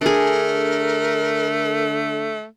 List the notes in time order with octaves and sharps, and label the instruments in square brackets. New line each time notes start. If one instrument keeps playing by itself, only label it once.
[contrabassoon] D3 [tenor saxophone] A3 [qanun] D4 G#4 [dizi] A#4